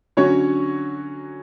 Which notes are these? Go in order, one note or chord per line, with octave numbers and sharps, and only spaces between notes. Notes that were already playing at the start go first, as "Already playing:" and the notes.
D3 F#3 C#4 F#4 C#5